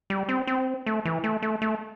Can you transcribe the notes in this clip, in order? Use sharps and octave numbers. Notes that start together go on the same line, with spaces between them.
G3
C4
C4
A3
E3
A3
A3
A3